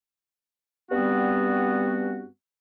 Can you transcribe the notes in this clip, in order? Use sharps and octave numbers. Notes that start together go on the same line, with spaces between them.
G2 G3 B3 C4 F#4